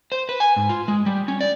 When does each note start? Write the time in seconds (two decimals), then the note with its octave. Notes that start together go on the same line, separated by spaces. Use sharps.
0.12 C5
0.29 B4
0.40 G#5
0.56 G#2
0.69 F4
0.88 G#3
1.06 G3
1.28 C#4
1.41 D5